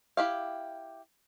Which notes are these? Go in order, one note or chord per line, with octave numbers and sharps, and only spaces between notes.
E4 G4 F5